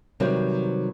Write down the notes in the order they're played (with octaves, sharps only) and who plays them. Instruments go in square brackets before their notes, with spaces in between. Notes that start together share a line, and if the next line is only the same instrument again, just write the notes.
[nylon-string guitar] C3 D#3 F#3 G3 B4 C5